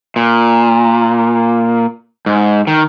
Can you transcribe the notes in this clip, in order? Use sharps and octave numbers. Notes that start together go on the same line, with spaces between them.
A#2
G#2
D#3